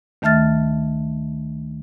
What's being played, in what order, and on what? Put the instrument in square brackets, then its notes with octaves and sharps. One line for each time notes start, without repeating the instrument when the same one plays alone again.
[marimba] D2 D#3 A3 E5 F6 A6